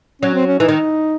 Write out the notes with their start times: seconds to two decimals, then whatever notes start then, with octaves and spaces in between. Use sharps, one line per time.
0.22 F#3 C#4
0.34 C4
0.47 C#4
0.59 E3 D#4
0.68 D#3